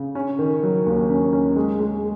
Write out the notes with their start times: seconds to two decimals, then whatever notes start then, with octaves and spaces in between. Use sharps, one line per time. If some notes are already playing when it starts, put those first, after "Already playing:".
Already playing: C#3
0.15 C#4
0.39 D#3
0.63 F#3
0.86 D#2
1.10 C#4
1.33 C#4
1.56 G#3
1.80 G#3